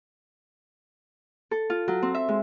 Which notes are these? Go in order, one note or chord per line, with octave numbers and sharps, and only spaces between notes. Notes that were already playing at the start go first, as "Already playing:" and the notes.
A4
F4
F#3
C4
E5
G#3